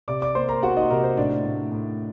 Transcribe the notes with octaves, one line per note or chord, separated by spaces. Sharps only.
C3 D5 D6
D5 D6
A#3 C5 C6
A#4 A#5
A#3 F#4 F#5
D#4 D#5
C3 A#4
C5
A2 D4 D5
A2
A2